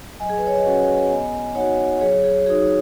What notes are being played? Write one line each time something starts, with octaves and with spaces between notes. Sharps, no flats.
F#3 D#5 G#5
G#4
B4
C#5
D#5
C#4 F#4 C#5 F#5
B3 D#5 G#5
D#4 F#4 C#5 F#5
F#3 G#4 C#5
G#4
D#4 F#4 G#4